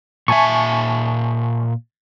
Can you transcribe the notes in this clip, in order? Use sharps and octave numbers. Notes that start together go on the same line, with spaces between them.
A#2 E5 G#5 A5 C#6